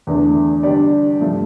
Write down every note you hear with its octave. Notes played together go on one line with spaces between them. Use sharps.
E2 D3 A3 D4
D3 G3 D4 G4 D5
G2 F3 A3